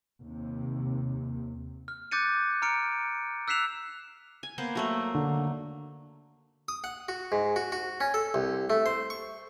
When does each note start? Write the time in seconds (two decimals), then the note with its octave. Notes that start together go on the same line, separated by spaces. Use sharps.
0.21 D#2 C3
1.88 F6
2.11 D6 F#6 G6 A6 C#7 D#7
2.62 A#5 F6 C#7 D7
3.48 E6 F#6 B6 C7 E7 F7
4.43 G#5
4.58 A#3 B3 C5
4.75 F#3 A3 A#3
5.14 D3
6.68 D#6
6.84 F#5
7.09 F#4
7.32 G#2
7.56 F#4
7.72 F#4
8.01 C#4
8.14 A4
8.34 C2
8.70 A3
8.86 C5
9.10 C#6